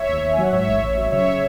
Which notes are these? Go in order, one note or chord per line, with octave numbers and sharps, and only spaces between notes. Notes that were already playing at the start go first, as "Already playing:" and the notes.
Already playing: C#5 E5
D#2
D#2
G#5
F#3 F#5
G#2 C#5 E5
A1
A1
F#3
C#3 C#5 E5